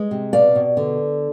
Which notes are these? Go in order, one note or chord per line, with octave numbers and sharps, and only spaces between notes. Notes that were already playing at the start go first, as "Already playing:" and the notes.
Already playing: G#3
C3
B2 D5 F5
B2
D3